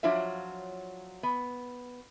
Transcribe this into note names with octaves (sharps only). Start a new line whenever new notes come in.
F3 F#3 D4 F4 C#5 E5
B3